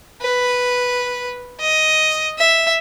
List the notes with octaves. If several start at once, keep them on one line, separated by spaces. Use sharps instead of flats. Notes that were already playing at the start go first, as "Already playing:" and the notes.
B4
D#5
E5